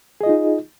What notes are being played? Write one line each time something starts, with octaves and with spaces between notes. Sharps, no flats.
D#4 F4 G#4 D#5